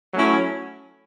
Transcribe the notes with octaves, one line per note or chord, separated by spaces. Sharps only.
F#3 A3 C#4 E4